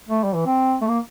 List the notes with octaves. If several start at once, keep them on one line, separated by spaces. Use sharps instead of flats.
A3
G3
E3
C4
A3
A#3